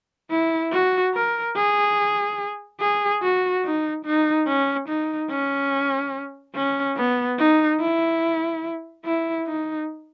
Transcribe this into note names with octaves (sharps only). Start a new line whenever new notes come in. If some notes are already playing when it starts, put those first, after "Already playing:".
E4
F#4
A#4
G#4
G#4
F#4
D#4
D#4
C#4
D#4
C#4
C#4
B3
D#4
E4
E4
D#4